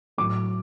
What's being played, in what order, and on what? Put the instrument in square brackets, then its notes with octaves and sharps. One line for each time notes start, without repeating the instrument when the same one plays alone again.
[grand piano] A2 F#3 A3 D6